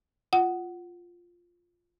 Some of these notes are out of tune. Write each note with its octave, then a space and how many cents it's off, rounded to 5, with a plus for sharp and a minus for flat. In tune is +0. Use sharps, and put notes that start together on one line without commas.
F4 +0 F#5 +10